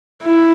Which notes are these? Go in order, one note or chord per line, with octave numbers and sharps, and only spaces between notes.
E4